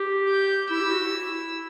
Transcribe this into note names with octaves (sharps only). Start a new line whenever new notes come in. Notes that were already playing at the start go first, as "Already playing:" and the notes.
Already playing: G4
G6
E4 E6
G4
F#4
E4